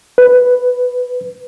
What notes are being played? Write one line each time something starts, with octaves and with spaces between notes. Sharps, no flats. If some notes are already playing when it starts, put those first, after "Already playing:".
B4